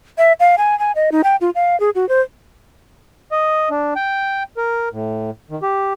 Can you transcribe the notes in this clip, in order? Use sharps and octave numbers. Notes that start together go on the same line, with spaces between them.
E5
F5
G#5
G#5
D#5
D#4
G5
F4
F5
G#4
F#4
C5
D#5
D4
G5
A#4
A2
D#3
G4